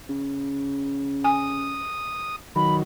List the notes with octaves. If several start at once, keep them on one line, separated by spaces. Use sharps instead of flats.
C#3
G#5 D#6
D#3 F#3 B5